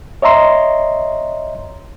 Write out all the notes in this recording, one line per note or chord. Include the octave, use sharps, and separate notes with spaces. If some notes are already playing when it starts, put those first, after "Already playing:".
C#5 D#5 E5 A#5 C6